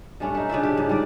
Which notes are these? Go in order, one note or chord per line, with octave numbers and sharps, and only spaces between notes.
G2 A3 C#4 D4
A3 D#4
C#3 D4 F4 E5
G4
G#2
G3 D5